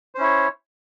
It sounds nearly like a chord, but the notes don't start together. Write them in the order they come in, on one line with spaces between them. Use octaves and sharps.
C5 C#4 E4 C#5